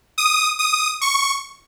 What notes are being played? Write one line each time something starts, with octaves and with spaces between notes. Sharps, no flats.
D#6
D#6
C#6